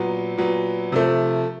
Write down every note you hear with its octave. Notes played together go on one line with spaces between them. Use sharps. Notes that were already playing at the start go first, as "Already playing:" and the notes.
Already playing: A#2 F#3 B3
A#2 F#3 B3
C3 F3 A3